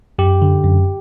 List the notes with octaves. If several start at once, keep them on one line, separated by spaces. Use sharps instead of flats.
F#2 G4
D3
F#2